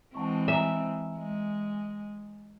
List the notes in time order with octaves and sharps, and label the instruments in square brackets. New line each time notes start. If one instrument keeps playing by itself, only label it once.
[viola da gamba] E3 G#3 C4 [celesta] F#5 A5 C#6
[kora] E5 [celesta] G#5 A#5
[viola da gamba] G#3